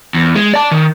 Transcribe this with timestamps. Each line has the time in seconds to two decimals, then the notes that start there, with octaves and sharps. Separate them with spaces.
0.14 E2
0.35 G#3
0.54 D5 A5
0.71 D#3